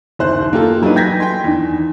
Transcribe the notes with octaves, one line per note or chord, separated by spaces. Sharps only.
F#1 D#2 C5 F#6
A#3 F4 G4 A4
E3 F#3 A#3 D4 D#4 B4
G5 G6 G#6 A#6 B6
G5 C6
E2 D#3 D4